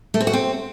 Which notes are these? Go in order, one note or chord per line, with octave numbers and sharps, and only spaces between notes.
A3
C4
F#4
C4